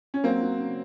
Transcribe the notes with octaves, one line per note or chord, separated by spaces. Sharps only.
C#4
F#3 A#3 C4
F#3
C#3